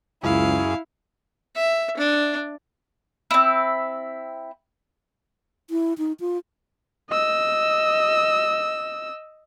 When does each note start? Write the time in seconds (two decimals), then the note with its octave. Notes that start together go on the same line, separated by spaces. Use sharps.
0.24 C#2 F#2 E4 G#4 F5
1.55 E5
1.97 D4
3.31 C4 E4
5.70 E4
5.98 D#4
6.20 F4
7.10 D#5 E6